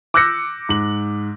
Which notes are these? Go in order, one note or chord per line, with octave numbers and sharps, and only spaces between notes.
D6 E6 F#6 G6 A#6 C#7
G#2 F#7